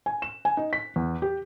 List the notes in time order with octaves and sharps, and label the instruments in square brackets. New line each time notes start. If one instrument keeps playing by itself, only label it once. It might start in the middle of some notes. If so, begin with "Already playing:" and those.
[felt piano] G#5
E7
G#5
D#4
B6
E2
G4